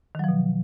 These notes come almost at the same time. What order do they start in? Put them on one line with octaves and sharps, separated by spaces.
D#3 F#3 F3 B2